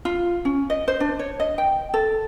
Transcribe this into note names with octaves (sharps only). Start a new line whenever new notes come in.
F4
C#4
D#5
C5
D4
C#5
D#5
G5
A4